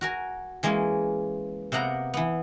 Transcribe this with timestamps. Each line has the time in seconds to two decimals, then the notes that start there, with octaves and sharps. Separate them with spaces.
0.01 F#4 A#4 G#5
0.63 E3 G#3 A#3 C#4
1.72 C3 A#3 B3 F#5 A#5
2.14 E3 B3